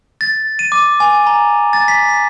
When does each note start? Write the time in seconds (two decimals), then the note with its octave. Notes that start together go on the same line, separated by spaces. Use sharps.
0.21 A6
0.59 D#7
0.72 D6
1.00 G#5
1.27 A#5
1.73 A6
1.88 B6